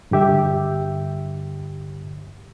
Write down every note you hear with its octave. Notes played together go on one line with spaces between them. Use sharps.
G2 D3 G4 E5